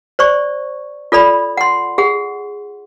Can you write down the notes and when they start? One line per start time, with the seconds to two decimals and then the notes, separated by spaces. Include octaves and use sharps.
0.19 C5 D5 C#6
1.12 F4 A4 D5 B5
1.57 F#5 C6
1.98 G#4 F#5